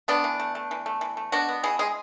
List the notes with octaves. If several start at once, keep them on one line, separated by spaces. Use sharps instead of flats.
A3 B3 D4
E3
A3
A3
E3
A3
E3
A3
B2 D4 F#4
B3
B2 E4 G#4
G#3 G#4